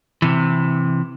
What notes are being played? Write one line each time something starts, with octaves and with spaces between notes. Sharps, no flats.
C3 E3